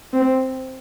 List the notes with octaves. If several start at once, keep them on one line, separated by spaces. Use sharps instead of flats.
C4